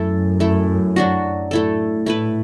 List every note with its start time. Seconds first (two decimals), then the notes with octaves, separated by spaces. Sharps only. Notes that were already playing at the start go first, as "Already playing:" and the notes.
Already playing: F#2 A3 E4 A4
0.40 A3 E4 A4
0.96 F#3 D4 F#4
1.51 A2 A3 E4 A4
2.06 A3 E4 B4